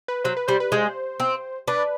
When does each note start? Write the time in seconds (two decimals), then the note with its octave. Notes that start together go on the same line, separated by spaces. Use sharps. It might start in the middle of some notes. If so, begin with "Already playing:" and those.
0.08 B4
0.24 F#3 C5
0.37 B4
0.48 G3 C5
0.60 B4
0.72 G#3 C5
1.20 C4
1.68 D4 B4